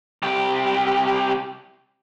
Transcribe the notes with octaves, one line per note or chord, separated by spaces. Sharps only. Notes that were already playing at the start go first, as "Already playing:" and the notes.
C2 G4